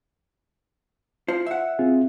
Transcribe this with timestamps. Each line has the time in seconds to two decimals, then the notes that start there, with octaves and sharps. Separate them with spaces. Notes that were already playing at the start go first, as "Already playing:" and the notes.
1.28 F4 C5
1.46 E5 F#5
1.79 C4 F4 G#4